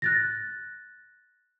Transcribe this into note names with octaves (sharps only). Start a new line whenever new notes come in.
F#6 A6 A#6